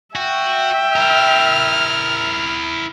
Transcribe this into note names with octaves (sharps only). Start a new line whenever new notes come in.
F#4 E5 G5
E4 A#4 F6